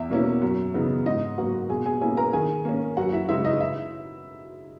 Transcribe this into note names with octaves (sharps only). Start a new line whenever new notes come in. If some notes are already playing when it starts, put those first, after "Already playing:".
Already playing: E2 E4 E5
B2 A#3 C#4 E4
F#2
C#3 E3 B3 D#4
G#2 D#4 D#5
F#3 A#3 F#4 F#5
B2 G#4 G#5
G#4 G#5
A#3 C#4 E4 G#4 G#5
A#4 A#5
D#3 G#4 G#5
A#3 C#4
F#2 F#4 F#5
E4 E5
C#3 G#3 D#4 E4 E5
D#4 D#5
E4 E5